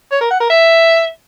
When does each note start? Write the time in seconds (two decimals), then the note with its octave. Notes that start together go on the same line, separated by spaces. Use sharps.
0.11 C#5
0.21 A#4
0.30 F#5
0.40 A#4
0.50 E5